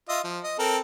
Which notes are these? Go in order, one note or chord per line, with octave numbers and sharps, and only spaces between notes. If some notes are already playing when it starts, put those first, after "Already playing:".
F4 D#5 E5
F3
D#5
C4 A4 A#4